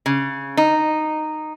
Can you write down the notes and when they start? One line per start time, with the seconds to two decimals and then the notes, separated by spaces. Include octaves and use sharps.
0.06 C#3
0.57 D#4